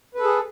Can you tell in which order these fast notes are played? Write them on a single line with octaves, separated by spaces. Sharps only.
B4 A4 G#4